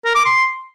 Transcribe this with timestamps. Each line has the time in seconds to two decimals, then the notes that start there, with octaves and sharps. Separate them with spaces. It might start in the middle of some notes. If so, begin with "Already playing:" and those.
0.05 A#4
0.15 D6
0.26 C6